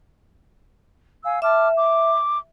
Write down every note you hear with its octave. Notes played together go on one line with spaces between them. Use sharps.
F5 G#5 E6
E5 A5 D6 F6
D6